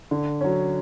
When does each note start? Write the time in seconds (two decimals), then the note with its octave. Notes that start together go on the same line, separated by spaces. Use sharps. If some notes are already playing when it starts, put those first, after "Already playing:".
0.11 D3
0.41 F#3 C#4